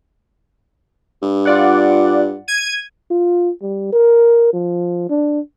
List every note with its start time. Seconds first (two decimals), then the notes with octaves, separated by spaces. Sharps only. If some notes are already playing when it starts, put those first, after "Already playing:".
1.22 G2
1.45 F4 D5 F#5
2.48 G#6 D#7
3.10 F4
3.62 G3
3.92 A#4
4.53 F3
5.09 D4